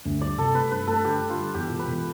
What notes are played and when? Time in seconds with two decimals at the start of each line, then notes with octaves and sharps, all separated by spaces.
0.05 D2
0.21 G3 D5
0.38 C3 A4
0.55 A3 B4
0.71 G2 B4
0.87 A3 A4
1.04 D3 G4
1.21 D3
1.30 F4
1.38 G3
1.54 E2 G4
1.71 E1
1.79 B4
1.87 E1